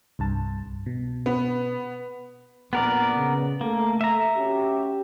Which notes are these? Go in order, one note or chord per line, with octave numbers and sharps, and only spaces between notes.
C2 G2 A5
B2
B3
A#1 F2 A#2 B3 A#4 D5
C#3
A3 A#3 A4
E5 A#5
C#4 F#4 G4